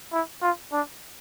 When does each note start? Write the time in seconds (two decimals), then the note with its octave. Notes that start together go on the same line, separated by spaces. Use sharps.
0.13 E4
0.42 F4
0.72 D4